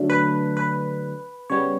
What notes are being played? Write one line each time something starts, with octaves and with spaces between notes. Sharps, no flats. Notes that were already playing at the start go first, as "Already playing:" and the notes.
Already playing: D3 F#3 A3 D4
B4
B4
C#3 G3 B3 C#5